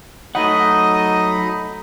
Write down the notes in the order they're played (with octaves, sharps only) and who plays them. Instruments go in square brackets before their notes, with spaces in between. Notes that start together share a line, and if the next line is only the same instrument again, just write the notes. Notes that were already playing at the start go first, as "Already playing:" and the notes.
[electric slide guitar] F#3 F#5 [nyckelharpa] A3 D#5 [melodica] D#4 B5 D#6